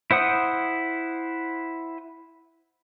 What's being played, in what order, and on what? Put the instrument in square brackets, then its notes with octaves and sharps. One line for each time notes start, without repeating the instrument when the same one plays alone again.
[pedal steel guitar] E4 C5 F#5 D#6